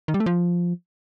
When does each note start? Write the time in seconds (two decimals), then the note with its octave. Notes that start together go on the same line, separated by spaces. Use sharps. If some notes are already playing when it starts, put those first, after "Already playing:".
0.08 D#3
0.14 G3
0.20 A3
0.26 F3